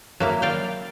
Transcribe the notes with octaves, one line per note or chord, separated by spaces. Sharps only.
F#3 A#3 E4
D5 F5 G5